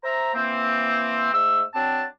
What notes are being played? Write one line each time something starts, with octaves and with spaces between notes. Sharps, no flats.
C5 E5 A#5
E3 A#3 C4
G#2 A3 E6
F#3 C4 D4 A5